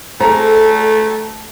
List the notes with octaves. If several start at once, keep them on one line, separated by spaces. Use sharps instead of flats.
A3 G#4 A4 C5 A#5